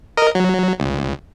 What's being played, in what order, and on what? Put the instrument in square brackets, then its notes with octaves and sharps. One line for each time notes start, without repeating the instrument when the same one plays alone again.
[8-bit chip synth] A#4 D#5
F#3
C#2